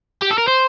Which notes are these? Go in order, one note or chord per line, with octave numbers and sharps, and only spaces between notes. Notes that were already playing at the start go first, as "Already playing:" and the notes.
G4
A4
A#4
C5